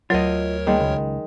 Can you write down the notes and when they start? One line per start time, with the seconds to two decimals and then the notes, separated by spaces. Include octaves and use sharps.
0.10 D2 F#3 F4 A#4 C#5 D#5
0.67 D#3 G3 G#3 A#3
0.80 C#2